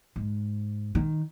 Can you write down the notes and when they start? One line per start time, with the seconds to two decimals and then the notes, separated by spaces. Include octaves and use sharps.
0.16 G#2
0.95 D#3